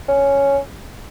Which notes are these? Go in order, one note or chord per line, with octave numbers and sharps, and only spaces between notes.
C#4